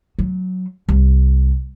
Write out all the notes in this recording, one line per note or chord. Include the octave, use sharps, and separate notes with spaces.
F#3
C2